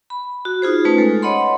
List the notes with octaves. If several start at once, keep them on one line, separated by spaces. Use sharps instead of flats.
B5
F#4
D#4 F4 G#4 C5
A3 C#4 D#4 F4 B4
G#3 A4
C#5 D#5 F#5 B5 C6